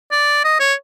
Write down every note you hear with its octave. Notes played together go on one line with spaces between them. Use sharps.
D5
D#5
C#5